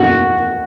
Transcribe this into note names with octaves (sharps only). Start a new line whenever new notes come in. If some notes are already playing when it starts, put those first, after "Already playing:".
Already playing: F#4